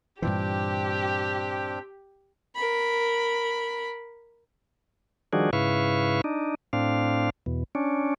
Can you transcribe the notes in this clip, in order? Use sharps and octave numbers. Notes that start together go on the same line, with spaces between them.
G2 A#2 E3 C4 D4 G4 G5
A#4 B5
D#3 F3 G3 D4 F#4 G#4
G#2 C#3 E4 B4 F5 C#6
D4 D#4
A2 C4 D4 F5
E2 B2
C#4 D4